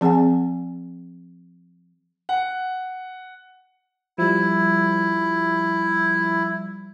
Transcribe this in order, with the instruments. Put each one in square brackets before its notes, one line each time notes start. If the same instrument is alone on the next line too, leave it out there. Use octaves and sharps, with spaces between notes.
[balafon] F3 C4 G#4 F#5 G#5
[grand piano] F#5
[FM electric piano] F3 G3 [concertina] E4